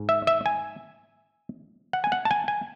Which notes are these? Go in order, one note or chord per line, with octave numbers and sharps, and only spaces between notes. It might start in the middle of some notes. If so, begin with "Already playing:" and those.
Already playing: G#2
E5
E5
G#5
F#5
G#5
F#5
A5
G#5
G#5